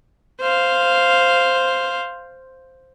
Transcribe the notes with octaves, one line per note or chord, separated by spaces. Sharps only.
C5 F5